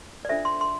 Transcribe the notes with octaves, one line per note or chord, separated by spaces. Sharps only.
D5
D4 F4 A4 C5 E5
C6
C6